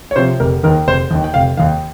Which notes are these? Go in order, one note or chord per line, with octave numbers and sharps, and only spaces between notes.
C#5
C3 F3 C5
F1 A#4
D#2 D#3 A#4
F1 C5
D#2 D#3
G5
F1 F5
D#2 D#3 F5